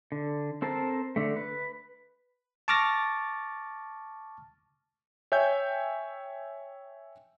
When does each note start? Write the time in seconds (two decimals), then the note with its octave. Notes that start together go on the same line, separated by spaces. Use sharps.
0.12 D3
0.62 C4 A4 A#4 C5 A5
1.16 D3 A3
1.37 B4
2.68 A5 C#6 D6 F6 A6 A#6
5.32 C#5 E5 G5 G#5 G6